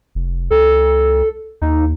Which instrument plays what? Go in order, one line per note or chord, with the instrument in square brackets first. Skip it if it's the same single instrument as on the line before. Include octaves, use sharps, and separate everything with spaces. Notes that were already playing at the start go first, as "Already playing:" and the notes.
[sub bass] F1
[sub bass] C#2 [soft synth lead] A4
[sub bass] D#2 [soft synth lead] D#4